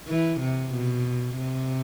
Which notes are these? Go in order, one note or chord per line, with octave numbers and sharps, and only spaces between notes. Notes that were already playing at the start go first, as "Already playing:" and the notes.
E3
C3
B2
C3